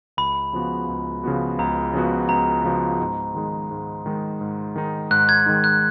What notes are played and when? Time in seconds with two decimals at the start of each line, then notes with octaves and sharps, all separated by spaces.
0.17 C#2 B5
0.53 C#3 F3 B3 F#4
0.88 C#2
1.24 C#3 F3 B3 F#4
1.59 C#2 A#5
1.93 C#3 F3 B3 F#4
2.29 C#2 A#5
2.64 C#3 F3 B3 F#4
3.00 G#2
3.35 D#3 G#3 D#4
3.71 G#2
4.06 D#3 G#3 D#4
4.41 G#2
4.76 D#3 G#3 D#4
5.11 G#2 F#6
5.29 G#6
5.46 D#3 G#3 D#4
5.64 F#6